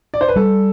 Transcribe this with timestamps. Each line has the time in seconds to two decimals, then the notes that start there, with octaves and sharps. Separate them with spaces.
0.14 D5
0.21 C5
0.28 B4
0.36 G3 A4